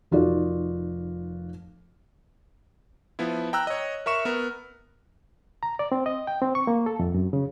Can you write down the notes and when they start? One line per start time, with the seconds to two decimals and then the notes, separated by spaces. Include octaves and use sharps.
0.11 F1 D#4 F4 F#4 A#4 D5
3.19 F3 B3 E4
3.53 G5 A#5 E6 F#6
3.67 C#5 D#5
4.06 A#4 E5 C#6 E7
4.25 B3 A#4
5.63 A#5
5.79 D5
5.92 C4
6.06 D#5
6.27 G5
6.42 C4
6.55 C#6
6.67 A#3
6.86 A4
6.99 F2
7.14 F#2
7.33 C#3